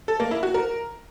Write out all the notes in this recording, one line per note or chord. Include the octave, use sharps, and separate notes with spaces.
A4
A#3
E4
F#4
A#4